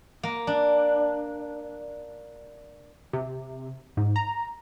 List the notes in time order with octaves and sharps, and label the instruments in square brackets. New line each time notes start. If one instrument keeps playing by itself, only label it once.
[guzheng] A#3
D4
[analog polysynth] C3
G#2
A#5